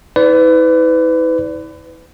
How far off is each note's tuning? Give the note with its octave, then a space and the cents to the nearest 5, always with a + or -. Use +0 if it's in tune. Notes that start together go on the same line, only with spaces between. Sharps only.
E4 -40 B4 +30 D5 -25